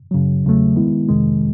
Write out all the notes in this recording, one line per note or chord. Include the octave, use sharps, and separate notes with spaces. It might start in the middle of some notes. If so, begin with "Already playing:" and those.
F#2 C#3 F#3
E2 C#3 F#3 A3
D#3 G#3 B3 E4
F2 C3 D#3 G#3